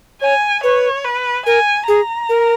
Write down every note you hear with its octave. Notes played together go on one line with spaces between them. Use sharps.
C#5 G#5
B4 C#5
B4
A#4 G#5
G#4 A#5
A#4